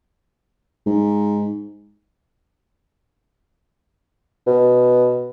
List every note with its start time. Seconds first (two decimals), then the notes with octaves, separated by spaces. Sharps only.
0.86 G#2
4.46 B2